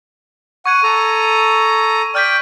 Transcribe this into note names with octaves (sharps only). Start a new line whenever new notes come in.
F#5 C#6 G#6 D#7
A4 A#5
D5 G5 F6 G6 B6